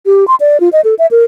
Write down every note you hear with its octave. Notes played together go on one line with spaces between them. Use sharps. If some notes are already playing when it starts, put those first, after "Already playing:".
G4
C6
D5
F4
D#5
A4
E5
A#4